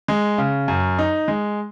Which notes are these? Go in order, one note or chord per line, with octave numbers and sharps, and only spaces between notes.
G#3
C#3
F#2
D#4
G#3